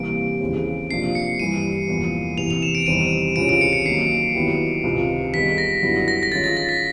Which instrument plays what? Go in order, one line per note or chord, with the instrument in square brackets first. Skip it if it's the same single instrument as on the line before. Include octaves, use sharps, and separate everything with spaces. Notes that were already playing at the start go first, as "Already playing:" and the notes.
Already playing: [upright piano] C3 E3 G3 A#3 [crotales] D7
[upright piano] D#2 C#3 E3 G#3 C4
[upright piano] C3 F3 A#3 D4 [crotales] C7
[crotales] C#7
[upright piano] G2 E3 G3 [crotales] D#7
[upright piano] E2 C3 F3 A#3
[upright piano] E2 C3 E3 [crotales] F7
[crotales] F7
E7
D7
[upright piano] E2 C3 D#3 G3 C4 [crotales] D#7
[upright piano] C#2 C3 E3 G#3 C#4 [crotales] D7
[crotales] D7
C#7
C#7
[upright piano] D#3 F#3 A#3 [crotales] C7
[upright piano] D#3 F#3 B3 E4 G4
C#2 C3 D#3
[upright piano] D#3 G3 B3 D#4 G#4 [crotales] B6
[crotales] A#6
[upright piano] F#2 D3 G3 B3 E4
[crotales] A#6
A#6
[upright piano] D#3 G#3 C#4 F4 [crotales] A6
[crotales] A6
A#6
B6